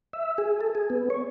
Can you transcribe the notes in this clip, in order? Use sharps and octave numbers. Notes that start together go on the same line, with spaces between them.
E5
G#4
A4
G#4
B3
C#5